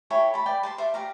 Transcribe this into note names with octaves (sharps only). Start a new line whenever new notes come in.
E4 G4 A4 C#5
A5 B5
B4 D5 G5
A5 A#5 C6
C5 D5 E5 F5
G4 D5 F5 A#5